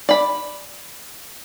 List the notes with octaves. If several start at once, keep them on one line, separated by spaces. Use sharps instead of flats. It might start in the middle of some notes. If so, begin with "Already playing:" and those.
D5 B5